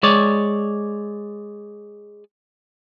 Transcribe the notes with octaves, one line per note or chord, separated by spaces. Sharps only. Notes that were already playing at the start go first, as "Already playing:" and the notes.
G#3 C#5 D5